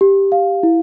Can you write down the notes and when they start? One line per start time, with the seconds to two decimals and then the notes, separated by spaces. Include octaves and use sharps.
0.01 G4
0.32 F5
0.63 E4